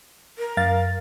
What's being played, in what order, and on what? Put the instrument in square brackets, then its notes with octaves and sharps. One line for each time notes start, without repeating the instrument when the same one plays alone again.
[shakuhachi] A#4
[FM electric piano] F#2 F5 A6